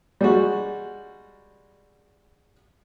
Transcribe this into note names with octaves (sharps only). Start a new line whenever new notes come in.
G3 G#3 F#4